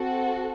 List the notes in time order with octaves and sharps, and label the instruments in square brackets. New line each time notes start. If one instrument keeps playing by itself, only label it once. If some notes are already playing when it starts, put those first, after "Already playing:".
Already playing: [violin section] C4 F#4 A4